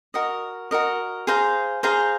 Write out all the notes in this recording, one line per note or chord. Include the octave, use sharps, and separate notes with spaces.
F#4 A#4 D#5
F#4 A#4 D#5
G#4 C5 F5 A#5
G#4 C5 F5 A#5